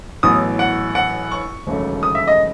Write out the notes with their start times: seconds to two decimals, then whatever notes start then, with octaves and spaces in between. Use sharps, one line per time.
0.23 A1 A2 F#3 B3 D#6
0.59 F#5
0.95 F#5
1.32 C#6
1.67 E1 D#2 C#3 F#3 A3
2.03 D#6
2.15 E5
2.27 D#5